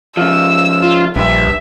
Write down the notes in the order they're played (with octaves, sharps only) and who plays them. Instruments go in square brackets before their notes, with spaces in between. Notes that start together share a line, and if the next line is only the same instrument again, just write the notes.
[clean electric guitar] C#3 F3 [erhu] E6
[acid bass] F4
[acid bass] A#1 [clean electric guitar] G2 [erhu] E5